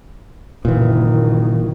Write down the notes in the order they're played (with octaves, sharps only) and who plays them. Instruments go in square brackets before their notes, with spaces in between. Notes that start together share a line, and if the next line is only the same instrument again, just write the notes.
[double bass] F#1 D#3 [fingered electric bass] A#2 E3